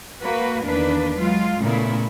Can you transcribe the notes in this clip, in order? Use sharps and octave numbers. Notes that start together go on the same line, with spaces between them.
A#3 F#4 B4
E2 D#3 A#3 D4 B4
F#3 G#3 F4
A#2 C#3 A3 B3 E4